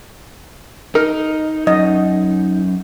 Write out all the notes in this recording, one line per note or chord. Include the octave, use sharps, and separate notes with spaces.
D#4 A#4
F#2 D#5